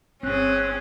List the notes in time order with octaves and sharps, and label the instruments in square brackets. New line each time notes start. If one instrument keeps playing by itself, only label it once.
[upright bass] G1 [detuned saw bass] C4 [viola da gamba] C#4 G#4 [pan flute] F#6